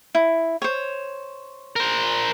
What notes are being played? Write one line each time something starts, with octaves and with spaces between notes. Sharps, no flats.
E4
C5 C#5
A#4 C5